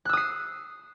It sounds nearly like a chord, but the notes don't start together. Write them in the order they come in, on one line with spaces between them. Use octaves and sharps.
F#6 E6 D#6 C7